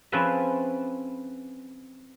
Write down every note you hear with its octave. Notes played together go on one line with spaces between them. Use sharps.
F3 C4 C#4 G#4 B4 E5